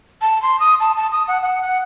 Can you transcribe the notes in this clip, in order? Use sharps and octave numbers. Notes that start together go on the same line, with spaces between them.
A5
C6
D#6
A5
A5
D#6
F#5
F#5
F#5